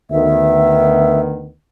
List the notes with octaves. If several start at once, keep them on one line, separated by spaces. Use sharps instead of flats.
D2 D#3 B3 E5